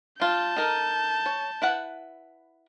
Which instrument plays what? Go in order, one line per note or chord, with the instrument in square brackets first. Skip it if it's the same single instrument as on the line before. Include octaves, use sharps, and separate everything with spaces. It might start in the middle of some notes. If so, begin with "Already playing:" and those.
[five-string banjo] G3 F4 [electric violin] A5 G6
[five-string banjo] D#4 A4 A#4
C#5
E4 B4 F#5